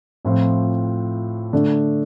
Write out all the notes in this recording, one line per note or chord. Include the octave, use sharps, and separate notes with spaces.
A2 F3 C4 F4
D3 A3 D4